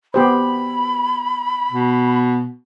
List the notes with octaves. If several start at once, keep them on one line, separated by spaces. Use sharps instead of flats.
B3 G4 C5 B5
B2